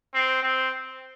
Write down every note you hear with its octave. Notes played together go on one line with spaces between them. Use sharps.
C4
C4